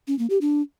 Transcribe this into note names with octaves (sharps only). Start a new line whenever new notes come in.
C#4
A#3
G4
D4